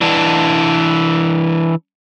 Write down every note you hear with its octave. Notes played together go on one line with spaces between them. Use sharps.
E3 D4